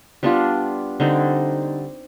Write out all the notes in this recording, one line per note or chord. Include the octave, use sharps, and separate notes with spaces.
G3 B3 D4 F4
D3 G3 C4 D#4